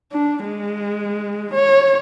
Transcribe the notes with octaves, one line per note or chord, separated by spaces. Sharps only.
D4
G#3
C#5